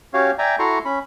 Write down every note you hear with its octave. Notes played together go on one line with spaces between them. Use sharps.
C#4 F#4 G4 C#5 F5
D5 E5 G5 G#5 A#5
E4 F#4 A4 A#5 C6 C#6
C#4 B5